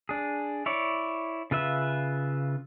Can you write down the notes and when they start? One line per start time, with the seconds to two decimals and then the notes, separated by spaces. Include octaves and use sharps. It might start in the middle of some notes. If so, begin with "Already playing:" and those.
0.09 D4 G#4
0.66 E4 C#5 D5
1.51 C#3 F4 B4 E5